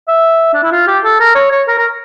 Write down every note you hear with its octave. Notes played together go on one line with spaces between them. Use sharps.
E5
D4
E4
F4
G4
A4
A#4
C#5
C#5
A#4
A#4